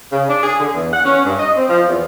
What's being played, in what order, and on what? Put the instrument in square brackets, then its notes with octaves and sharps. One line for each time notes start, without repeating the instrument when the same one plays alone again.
[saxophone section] C#3
D4
G#4
D3
E2
F#5
C#4
G2
D#5
C4
F3
E2